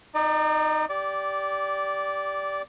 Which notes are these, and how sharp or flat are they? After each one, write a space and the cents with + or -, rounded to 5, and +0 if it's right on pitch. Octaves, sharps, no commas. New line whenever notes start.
D#4 -5 D5 +40
G4 +0 D5 -15